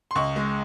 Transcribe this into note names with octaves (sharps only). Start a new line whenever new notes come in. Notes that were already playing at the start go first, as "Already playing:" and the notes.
C6
C#2 C#6
G#3